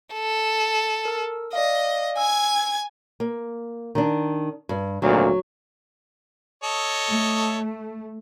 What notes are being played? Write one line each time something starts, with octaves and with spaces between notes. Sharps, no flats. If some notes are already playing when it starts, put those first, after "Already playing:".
A4
A#4 E6
D5 D#5 F5
G#5 E6 G#6
A#3
D#3 D4
G2
G#1 D2 A#2 F#3
A4 C#5 D#5
A3